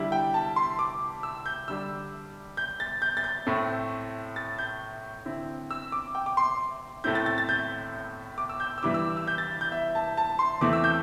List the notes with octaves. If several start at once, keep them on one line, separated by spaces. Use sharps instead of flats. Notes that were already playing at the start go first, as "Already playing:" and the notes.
Already playing: D3 G3 E4
G5
A5
C6
D6
E6
G6
D3 G3 D4 E6
G6
A6
G6
A6
G6
A2 A3 C4
A6
G6
D3 C4 E4
E6
D6
G5
D6
C6
A2 A3 C4 E4 G6
A6
A6
A6
G6
D6
E6
G6
E6
G2 E3 G3 E4 D6
E6
E6
G6
A6
G6
E5
A5
A5
C6
E2 E3 A3 C4 E4 D6
E6
G6